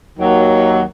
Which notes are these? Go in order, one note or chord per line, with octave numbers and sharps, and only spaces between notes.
D#2 D#3 F#3 A#3